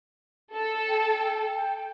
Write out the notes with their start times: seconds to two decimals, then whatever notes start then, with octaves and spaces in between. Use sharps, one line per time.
0.54 A4
0.88 G5
1.55 G5